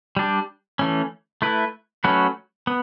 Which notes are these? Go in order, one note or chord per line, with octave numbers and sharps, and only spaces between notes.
G3 D4 G4
E3 A3 C#4
A3 E4 B4
F#3 A3 C#4 F#4 B4
B3